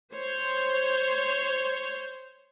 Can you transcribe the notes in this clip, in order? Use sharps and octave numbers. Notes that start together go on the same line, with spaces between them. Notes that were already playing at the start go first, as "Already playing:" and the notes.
C5 C#5